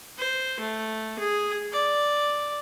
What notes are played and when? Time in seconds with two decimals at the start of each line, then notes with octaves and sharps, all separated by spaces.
0.18 C5
0.60 A3
1.19 G#4
1.72 D5